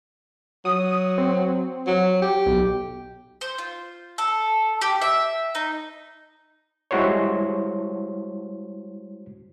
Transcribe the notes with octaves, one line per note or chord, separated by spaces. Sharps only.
F#3 D#6
C4
F#3
G4
B1
C5
F4
A4
G4
E5
D#4
G3 G#3 E4 F#4 C5 C#5